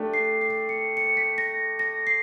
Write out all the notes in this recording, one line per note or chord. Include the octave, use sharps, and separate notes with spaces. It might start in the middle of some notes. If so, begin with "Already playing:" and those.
Already playing: A3 D4 G4
C7
C7
C#7
C#7
B6
A#6
A#6
C7